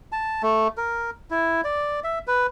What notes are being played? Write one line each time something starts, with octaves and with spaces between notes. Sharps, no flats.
A5
A3
A#4
E4
D5
E5
B4